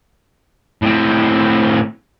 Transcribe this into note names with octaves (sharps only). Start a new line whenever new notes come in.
A2 C4